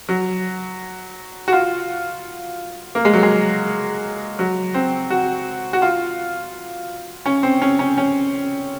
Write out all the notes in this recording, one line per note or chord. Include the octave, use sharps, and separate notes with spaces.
F#3
F#4
F4
A#3
G#3
F#3
G#3
F#3
C4
F#4
F#4
F4
C#4
C4
C#4
C#4
C#4